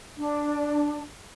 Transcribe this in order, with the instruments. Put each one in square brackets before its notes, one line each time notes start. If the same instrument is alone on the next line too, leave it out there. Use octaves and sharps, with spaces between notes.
[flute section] D4